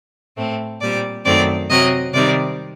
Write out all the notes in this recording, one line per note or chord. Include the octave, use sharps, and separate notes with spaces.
A2 A3 C4
A#2 G3 C4 D5
F#2 D#3 F#3 A3 C4 D5
C3 F#3 C4 D#5
C3 D#3 G3 C4 D5